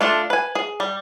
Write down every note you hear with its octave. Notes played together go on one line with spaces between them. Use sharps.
A3 D4 F4
B4 G#5
G#4
G3